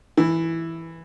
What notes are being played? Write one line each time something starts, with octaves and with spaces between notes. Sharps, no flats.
E3